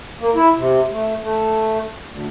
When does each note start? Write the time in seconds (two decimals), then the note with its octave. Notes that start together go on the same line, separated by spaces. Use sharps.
0.20 A#3
0.35 E4
0.56 C3
0.91 A3
1.23 A3
2.09 D2